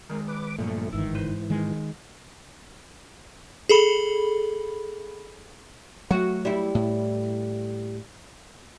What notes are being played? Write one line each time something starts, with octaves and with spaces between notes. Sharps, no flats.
D#3 G#3 A#4
B4 D6
G2 A#2 D3 F3 F#3 A3
G1 G#2 D#3 E3 E4
B4 C5
D#3 G#3
G#4 A4 B5
F#3 A3 F#4
G3 E4
A2